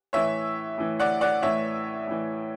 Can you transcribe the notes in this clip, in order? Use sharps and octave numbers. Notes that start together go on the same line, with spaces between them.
A2 E3 C#5 E5
A2 E3
D5 F#5
D5 F#5
A2 E3 C#5 E5
A2 E3